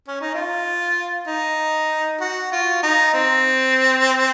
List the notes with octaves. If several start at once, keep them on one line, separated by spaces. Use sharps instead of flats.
C#4
D#4
F4
D#4
F#4
F4
D#4
C4